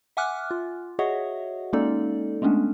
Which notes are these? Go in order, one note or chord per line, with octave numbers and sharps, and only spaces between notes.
E5 F#5 G#5 D6 F6 F#6
F4
F#4 G#4 C#5 D#5 E5 F#5
G#3 A#3 C#4 D#4 A4 D5
G#3 A3 B3 C#4 D4